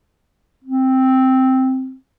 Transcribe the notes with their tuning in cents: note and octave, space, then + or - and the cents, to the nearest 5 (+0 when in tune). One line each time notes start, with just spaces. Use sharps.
C4 +0